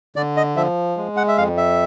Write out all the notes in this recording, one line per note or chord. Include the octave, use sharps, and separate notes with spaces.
D3 D5
D#5
F3 E5
G#3
F#5
E5
F2 F5
E5